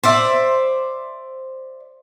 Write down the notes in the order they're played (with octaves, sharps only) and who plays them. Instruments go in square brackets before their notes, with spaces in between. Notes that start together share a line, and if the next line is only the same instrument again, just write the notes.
[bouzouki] C5 D5 E5